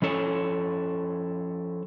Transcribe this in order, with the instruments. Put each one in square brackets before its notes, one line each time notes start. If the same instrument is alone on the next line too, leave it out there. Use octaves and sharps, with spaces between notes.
[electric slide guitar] F3 C#4 A4 C#5